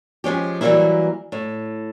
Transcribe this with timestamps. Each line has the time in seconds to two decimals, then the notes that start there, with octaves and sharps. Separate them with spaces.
0.24 F3 G#3 C#4 G4
0.61 E3 F#3 G3 A3 A#3 E4
1.32 A2